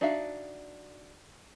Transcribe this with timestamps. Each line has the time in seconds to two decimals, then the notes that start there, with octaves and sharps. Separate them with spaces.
0.01 D4 D#4 F#4 E5 F5